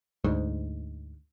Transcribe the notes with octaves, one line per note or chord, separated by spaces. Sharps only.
D2 G#2